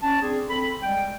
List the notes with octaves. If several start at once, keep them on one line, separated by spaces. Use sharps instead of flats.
C#4 A5
C4 D4 G#4
C4 A4 B5
G3 G#3 G5